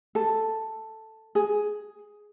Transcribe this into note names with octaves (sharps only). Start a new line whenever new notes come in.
A4
G#4